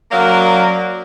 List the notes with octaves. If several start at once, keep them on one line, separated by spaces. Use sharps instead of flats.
F#3 A#3 C#4 A#4 D5 F5